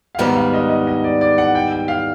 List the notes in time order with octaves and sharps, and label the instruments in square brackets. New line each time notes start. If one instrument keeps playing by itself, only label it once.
[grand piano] F5
[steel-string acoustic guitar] G#2 D#3 G3 B3 [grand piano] F#5
[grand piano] F5
D#5
D#5
D#5
D5
D5
F#5
G5
G5
F5